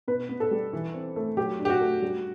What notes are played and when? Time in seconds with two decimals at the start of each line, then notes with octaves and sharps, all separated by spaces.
0.08 B2 B4
0.29 B3
0.40 A4
0.51 G3
0.73 E3
0.94 C4
1.16 A3
1.37 F#3 G4
1.59 D4
1.65 G4
1.70 F#4
1.81 A3
2.02 G3